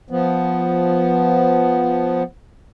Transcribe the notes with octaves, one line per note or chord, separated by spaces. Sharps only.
F3 B3